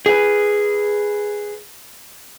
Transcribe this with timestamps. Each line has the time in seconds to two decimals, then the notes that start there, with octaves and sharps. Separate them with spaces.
0.06 G#4 B4